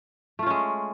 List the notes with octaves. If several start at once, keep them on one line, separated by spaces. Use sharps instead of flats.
G#3 A3 C#4 F4